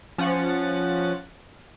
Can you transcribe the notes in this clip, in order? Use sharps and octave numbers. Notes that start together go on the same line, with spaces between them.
F3 C#4 F#5 A6